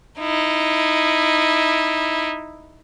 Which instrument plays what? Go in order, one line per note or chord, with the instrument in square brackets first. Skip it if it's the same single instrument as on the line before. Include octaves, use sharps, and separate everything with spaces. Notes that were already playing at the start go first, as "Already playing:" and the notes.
[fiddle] D#4 E4